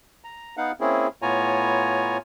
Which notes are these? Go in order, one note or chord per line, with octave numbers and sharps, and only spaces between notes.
A#5
B3 D#4 F5 F#5
A#3 C4 C#4 E4 G#4
A2 B3 F4 C#5 G#5 A#5